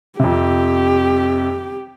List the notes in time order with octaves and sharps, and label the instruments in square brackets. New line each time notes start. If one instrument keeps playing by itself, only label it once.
[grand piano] F2 C3 [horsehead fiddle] G4